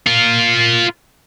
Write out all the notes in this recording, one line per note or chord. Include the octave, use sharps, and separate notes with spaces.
F4 A#4